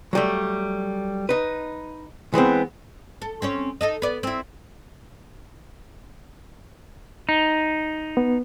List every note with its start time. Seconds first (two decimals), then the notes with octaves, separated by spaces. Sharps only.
0.13 F#3 G3 A3
1.29 D#4 B4
2.34 E3 G#3 B3 C4
3.22 A4
3.42 C4 C#4 C#5
3.81 D#4 A4 D#5
4.02 B3 D5
4.23 C4 E4
7.29 D#4
8.17 B3